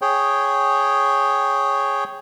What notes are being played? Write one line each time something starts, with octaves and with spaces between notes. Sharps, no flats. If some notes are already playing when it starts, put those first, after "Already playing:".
G#4 C#5 G5